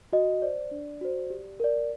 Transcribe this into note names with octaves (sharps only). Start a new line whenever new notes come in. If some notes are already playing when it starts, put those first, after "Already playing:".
F#4 D#5
C5 D5
D4
F#4 C5
G4
A#4 D5